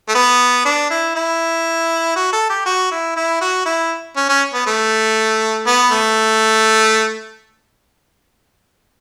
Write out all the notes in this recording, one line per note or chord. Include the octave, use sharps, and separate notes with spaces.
A3
B3
D4
E4
E4
F#4
A4
G4
F#4
E4
E4
F#4
E4
C#4
C#4
B3
A3
B3
A3